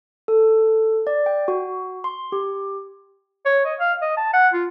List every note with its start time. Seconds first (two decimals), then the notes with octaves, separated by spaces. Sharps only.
0.28 A4
1.07 D5
1.26 G5
1.48 F#4
2.04 C6
2.32 G4
3.45 C#5
3.65 D#5
3.79 F5
4.02 D#5
4.17 A5
4.33 F#5
4.53 F4